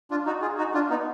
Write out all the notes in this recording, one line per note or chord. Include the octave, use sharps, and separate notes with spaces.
D4 F4
D#4 F#4
F4 G#4
D#4 F#4
D4 F4
B3 D#4